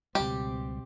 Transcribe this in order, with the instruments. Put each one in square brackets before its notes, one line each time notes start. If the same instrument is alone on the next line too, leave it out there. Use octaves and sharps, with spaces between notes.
[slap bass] C#2 G3 [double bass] B2 C4 [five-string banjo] G4